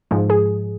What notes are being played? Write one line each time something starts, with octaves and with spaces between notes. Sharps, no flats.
G#2 F3 G#3
G#4